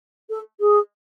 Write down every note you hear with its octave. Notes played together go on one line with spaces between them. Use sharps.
A4
G#4